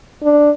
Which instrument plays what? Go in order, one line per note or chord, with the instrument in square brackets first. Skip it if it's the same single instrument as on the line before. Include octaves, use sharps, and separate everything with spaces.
[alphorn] D4